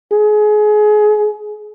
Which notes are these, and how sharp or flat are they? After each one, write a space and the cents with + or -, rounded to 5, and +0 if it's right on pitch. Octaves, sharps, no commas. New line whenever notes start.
G#4 +25